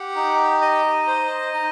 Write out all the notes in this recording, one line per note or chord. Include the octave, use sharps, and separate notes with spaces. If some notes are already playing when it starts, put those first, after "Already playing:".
Already playing: G4 F#5
D#4
D#5
C5
D#4